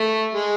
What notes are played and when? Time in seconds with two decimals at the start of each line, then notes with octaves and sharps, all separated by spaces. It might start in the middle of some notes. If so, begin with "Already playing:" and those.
Already playing: A3
0.35 G#3